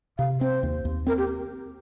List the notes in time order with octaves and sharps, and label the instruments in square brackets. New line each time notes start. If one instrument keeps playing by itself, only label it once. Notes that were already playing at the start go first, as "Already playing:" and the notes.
[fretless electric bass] C3 [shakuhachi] F5
[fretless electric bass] C4 [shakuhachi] C5
[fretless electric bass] D#2
D#2
[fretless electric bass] C4 [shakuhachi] A#4
[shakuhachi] G4